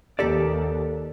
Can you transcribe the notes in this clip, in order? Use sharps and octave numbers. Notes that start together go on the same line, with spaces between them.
D#2 G4 A4 D5